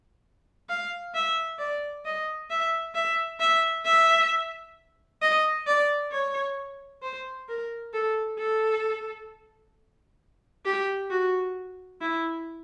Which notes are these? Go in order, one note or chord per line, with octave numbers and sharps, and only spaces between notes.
F5
E5
D5
D#5
E5
E5
E5
E5
D#5
D5
C#5
C5
A#4
A4
A4
G4
F#4
E4